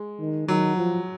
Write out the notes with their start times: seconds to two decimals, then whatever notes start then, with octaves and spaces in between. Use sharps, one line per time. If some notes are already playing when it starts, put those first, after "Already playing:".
Already playing: G#3
0.19 D#3
0.48 D#3 F#3
0.76 F3